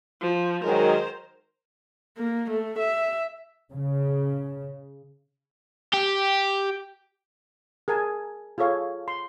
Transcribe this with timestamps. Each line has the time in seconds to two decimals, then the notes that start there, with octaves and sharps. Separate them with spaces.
0.21 F3
0.64 D#3 F#3 G#3 A#4 C5
2.17 A#3
2.51 A3
2.79 E5
3.72 C#3
5.93 G4
7.88 G#4 A#4 G#5 A5
8.58 F4 G#4 A4 C#5 F5
9.08 C6